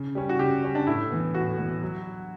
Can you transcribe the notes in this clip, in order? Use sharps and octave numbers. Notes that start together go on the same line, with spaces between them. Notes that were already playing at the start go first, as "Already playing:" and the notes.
Already playing: C#3
G3 C#4
F#4
C#3 G4
G3 C#4
D4
A2 E4
E3 B3
A2 F#4
E3 B3
F#3